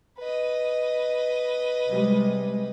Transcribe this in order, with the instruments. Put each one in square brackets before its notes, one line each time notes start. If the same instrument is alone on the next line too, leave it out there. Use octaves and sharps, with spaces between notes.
[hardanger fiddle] B4 D#5
[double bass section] C3 G3 G#3